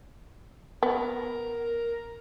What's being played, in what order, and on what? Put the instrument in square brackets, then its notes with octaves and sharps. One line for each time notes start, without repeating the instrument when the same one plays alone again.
[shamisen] B3 [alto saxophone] A#4